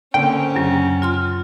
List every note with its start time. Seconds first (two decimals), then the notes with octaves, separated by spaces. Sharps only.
0.14 D3 A#3 C4 C#4 G5
0.56 F#2 C#3 F#3
1.02 F4 C6 F6